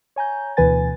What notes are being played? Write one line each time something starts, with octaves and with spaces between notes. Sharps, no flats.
C#5 G#5 A#5 G6
D2 B2 E3 B4 G#5 A6